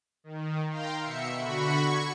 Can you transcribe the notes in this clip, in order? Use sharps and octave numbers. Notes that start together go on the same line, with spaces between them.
D#3
F5 G5 A#5 C6
B2 E5 C#7
D3 F#4 B5 C#6
C#6 G#6